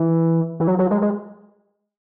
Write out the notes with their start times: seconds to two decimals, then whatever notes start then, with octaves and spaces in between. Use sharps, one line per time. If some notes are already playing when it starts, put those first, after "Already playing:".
Already playing: E3
0.60 E3
0.67 F#3
0.79 F#3
0.91 G#3
1.02 G#3